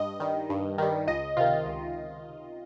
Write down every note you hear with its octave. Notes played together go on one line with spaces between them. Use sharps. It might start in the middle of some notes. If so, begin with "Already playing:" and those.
Already playing: G2 D#5
D#3 G3
G2
D#3 G3
C#2 D#5
C3 D#3 F4
C#2